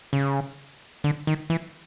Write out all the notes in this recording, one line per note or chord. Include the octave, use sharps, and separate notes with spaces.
C#3
D3
D#3
E3